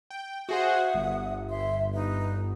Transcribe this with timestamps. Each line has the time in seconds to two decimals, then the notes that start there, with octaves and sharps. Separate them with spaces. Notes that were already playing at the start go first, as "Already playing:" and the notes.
0.10 G5
0.49 F#4 G#4 C5 E5 F#5 D#6
0.94 G1
1.49 E5 C6
1.91 D#4 B4